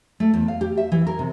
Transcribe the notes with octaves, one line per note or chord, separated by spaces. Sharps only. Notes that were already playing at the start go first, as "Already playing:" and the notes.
A3
E2
F5
G4
E5
E3
A#4
C3